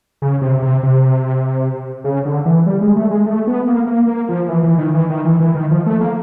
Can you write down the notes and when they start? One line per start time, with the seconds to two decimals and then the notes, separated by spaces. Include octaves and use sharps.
0.22 C#3
0.41 C3
0.62 C3
0.83 C3
2.04 C#3
2.25 D3
2.45 E3
2.66 G3
2.81 G#3
2.96 A3
3.11 G#3
3.26 A3
3.47 B3
3.67 A#3
3.87 A#3
4.07 A#3
4.29 F3
4.48 E3
4.63 E3
4.78 D#3
4.94 E3
5.10 D#3
5.25 E3
5.40 E3
5.55 D#3
5.71 F3
5.86 A3
6.01 A#3